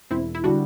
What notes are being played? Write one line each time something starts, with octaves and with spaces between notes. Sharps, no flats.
E1 C4 E4
E4
D3 G3 D4 F#4